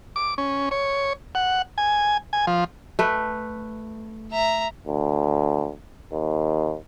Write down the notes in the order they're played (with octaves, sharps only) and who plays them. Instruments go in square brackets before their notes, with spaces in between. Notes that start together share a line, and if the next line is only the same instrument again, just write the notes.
[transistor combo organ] D6
C#4
C#5
F#5
G#5
G#5
F3
[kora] A3 B4
[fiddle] E5 A#5
[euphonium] D2
D#2